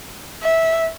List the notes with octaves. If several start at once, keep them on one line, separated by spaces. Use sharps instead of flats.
E5